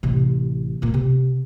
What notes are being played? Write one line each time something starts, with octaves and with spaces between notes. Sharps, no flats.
A1 C3
A#2 A#3
C3